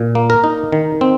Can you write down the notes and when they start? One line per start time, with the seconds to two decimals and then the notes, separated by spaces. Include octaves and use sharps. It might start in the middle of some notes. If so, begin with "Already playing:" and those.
Already playing: A#2
0.15 A#3
0.30 A#4
0.44 D#4
0.72 D#3
1.01 C4